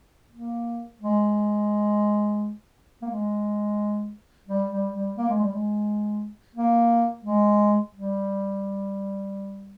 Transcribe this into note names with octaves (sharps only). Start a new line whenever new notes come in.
A#3
G#3
A#3
G#3
G3
G3
G3
A#3
G#3
G3
G#3
A#3
G#3
G3